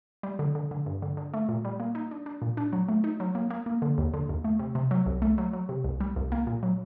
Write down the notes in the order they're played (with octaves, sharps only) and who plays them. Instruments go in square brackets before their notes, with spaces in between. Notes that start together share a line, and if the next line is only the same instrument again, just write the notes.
[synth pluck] G3
D3
D3
D3
G2
D3
D3
A3
A#2
G3
A#3
D#4
D4
D4
A#2
D4
F#3
A3
D#4
F#3
A#3
A#3
A#3
D3
D#2
D3
D#2
A3
C3
C3
F#3
C2
A3
F#3
F#3
C3
C2
G3
C2
A#3
A#2
F#3